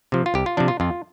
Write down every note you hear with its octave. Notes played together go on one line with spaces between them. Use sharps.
C3 F3
F4
C2 G4
F4
C3 F3 D4
F4
F2 F4